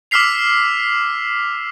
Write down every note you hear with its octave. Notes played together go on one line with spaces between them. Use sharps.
D6 E6 F6 B6 C7 F7